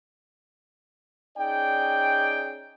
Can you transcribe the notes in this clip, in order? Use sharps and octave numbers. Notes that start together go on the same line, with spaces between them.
C#4 D#4 G#4 D5 G5